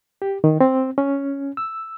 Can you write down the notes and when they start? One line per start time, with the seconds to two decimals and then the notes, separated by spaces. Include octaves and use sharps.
0.22 G4
0.44 D#3
0.61 C4
0.98 C#4
1.57 E6